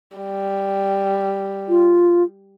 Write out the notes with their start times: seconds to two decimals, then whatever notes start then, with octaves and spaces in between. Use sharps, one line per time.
0.17 G3
1.69 F4